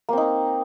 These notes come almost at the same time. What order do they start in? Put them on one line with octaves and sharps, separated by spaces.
A#3 C4 D#4